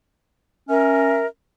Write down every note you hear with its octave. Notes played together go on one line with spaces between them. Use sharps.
C#4 A#4 E5